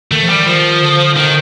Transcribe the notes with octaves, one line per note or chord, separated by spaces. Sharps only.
D#3 A3
F3
D#3 G3
F3
D3
D#3